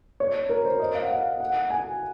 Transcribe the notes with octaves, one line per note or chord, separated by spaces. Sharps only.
C#5
A#4
C5
D#5
F5
F#5
F5
F#5
G#5